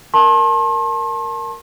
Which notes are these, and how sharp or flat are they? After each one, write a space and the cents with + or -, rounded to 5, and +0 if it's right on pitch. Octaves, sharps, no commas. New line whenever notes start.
A#4 +0 A5 +0 C6 +45